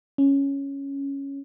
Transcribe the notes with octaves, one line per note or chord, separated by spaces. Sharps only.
C#4